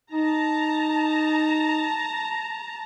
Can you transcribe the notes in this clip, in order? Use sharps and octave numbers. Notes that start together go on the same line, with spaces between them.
D#4 A5 A#5